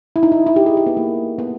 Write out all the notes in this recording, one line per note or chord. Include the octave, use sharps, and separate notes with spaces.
E4
D#4
E4
E4
G4
G#4
G4
B3
A#3
B3